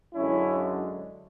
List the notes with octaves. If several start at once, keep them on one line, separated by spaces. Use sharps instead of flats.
F#2 D3 G#3 C#4 E4